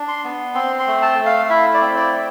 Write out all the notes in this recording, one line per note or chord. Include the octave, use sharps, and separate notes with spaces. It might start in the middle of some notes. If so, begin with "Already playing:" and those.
Already playing: D4
C6
B3
C4 C6
C6
A3
A5
A3
F5
E4 E5
D5
C4
D5
A3